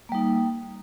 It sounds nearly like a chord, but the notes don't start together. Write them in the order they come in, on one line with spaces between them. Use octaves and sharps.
A#3 G3 D#4